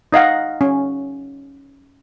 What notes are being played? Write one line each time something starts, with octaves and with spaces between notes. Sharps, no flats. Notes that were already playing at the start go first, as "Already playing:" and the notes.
D#4 D#5 F5 F#5
C#4